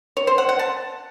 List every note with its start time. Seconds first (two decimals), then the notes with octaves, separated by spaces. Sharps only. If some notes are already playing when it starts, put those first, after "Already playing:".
0.17 C#5
0.27 C5
0.38 F#5
0.49 F#5
0.59 A5